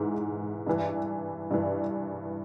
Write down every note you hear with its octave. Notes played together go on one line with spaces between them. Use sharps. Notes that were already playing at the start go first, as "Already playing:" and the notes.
Already playing: G#2 E3
G2 E3
G2 E3